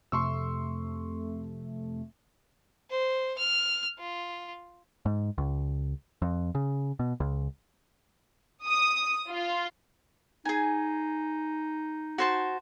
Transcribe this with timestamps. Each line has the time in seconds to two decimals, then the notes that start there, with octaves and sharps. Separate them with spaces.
0.12 F2 C3 A3 C6 C#6 E6
2.91 C5
3.38 F6
3.99 F4
5.06 G#2
5.38 C#2
6.22 F2
6.55 C#3
6.99 B2
7.20 C#2
8.66 D#6
9.29 F4
10.45 D#4 G#4 G#5
12.18 F#4 C5 A5